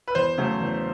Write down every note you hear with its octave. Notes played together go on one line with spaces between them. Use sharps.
B4
E2 C5
C#3 F#3 A3
E2